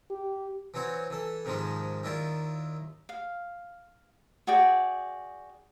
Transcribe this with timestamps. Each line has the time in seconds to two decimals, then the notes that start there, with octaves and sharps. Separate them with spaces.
0.10 G4
0.74 E3 F#3 C4 C#5 F#5
1.10 E3 A4
1.45 G#2 C3 D#3 F3 G#3 D#4
2.03 D#2 D#3 E4 F4 D5
3.09 F5
4.47 F#4 G#4 D5 G5